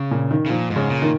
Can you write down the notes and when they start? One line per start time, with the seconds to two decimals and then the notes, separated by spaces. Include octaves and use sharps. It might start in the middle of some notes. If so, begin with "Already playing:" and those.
Already playing: C#3
0.11 A#2
0.31 D#3
0.46 C#3
0.50 A#2 F3
0.70 G#2
0.76 C#3
0.90 A#2
1.02 D#3